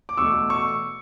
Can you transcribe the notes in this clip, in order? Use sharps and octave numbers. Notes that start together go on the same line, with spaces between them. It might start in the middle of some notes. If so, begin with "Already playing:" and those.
D6
E2 B2 A3 C#6 E6
C#6 E6